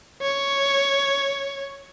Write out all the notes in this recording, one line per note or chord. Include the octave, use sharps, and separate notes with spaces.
C#5